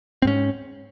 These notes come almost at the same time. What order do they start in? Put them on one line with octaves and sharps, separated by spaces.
C4 G#2 C#4